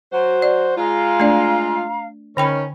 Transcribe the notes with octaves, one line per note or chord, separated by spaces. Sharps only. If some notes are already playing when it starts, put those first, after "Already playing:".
F#3 F#4 C5
D5
G#3 F4 F5 A#5
A3 D4 D5
D3 D#3 C#4 G5 B5